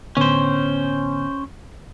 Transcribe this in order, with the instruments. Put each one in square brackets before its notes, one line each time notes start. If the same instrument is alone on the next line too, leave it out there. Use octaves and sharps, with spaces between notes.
[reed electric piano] A2 D3 B3 [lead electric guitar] C#4 C5